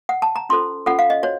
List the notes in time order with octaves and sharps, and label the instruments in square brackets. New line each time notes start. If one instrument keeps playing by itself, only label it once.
[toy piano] F#5
A5
A#5
C#4 F4 A4 C5 C6
C#4 F4 A4 C5 F#5
F5
D#5
F#4 C5 C#5